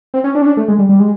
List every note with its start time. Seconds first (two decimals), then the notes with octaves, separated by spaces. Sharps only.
0.14 C4
0.24 C#4
0.35 D4
0.42 C#4
0.46 D4
0.57 A3
0.68 G#3
0.79 G3
0.89 G3
1.00 G#3